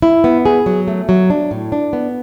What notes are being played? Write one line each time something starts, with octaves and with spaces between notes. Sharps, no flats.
E4
B3
G#4
F#3
A3
F#3
D4
A2
D4
B3